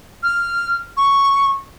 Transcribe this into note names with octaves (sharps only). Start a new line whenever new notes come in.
F6
C#6